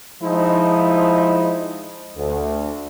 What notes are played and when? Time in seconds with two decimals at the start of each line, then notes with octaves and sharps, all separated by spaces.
0.23 F3 G#3 D#4 E4
2.16 D2